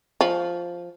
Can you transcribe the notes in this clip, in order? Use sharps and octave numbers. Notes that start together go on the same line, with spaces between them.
F3